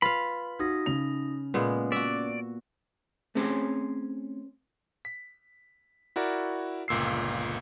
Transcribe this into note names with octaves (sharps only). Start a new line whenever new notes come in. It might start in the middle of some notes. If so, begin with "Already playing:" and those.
F4 B4 F5 B5
D#4 F#4 D#6 A#6
C#3 F7
A#2 G#3 B3 B4
F#4 D5 E5
A3 C4 C#4 G#4 C5
B6
E4 F#4 A#4 D5
G1 C#2 A#2 E6 C7